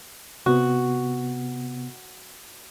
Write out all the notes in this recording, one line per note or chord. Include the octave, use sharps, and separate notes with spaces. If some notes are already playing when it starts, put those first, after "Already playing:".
C3 B3 F#4